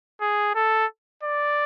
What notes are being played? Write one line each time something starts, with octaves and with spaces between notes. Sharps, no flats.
G#4
A4
D5